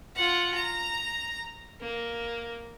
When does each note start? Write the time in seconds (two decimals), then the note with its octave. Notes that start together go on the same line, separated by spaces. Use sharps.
0.15 F4 F#5
0.55 A#5
1.80 A#3